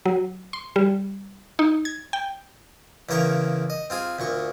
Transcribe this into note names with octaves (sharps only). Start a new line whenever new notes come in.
F#3
C6
G3
D#4
G#6
G5
E2 C#3 A#3 G5 A#5 C#6
D#5
C4 F4 G#4
D2 A#2 C#6